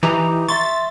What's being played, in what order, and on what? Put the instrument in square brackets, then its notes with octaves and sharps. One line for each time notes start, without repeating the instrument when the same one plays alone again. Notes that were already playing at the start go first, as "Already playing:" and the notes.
[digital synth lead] E3 [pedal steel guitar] D#4 G4 A#5
[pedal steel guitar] E5 C6 C#6 [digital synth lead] A6